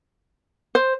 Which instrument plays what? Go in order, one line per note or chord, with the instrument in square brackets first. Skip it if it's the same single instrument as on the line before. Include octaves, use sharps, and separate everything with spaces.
[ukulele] C5